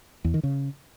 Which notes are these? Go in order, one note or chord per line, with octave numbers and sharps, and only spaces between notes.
E2
D#3
C#3